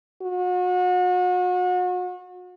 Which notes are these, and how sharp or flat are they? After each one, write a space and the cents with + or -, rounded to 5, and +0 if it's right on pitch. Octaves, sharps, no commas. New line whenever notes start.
F#4 -35